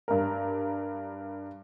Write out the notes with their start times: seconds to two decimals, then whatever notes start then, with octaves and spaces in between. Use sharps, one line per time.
0.08 G2 A#4